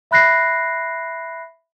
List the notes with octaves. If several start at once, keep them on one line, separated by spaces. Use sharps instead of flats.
E5 B5 F#6 A#6 C7